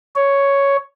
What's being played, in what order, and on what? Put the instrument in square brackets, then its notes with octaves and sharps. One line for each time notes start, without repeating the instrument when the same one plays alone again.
[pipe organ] C#5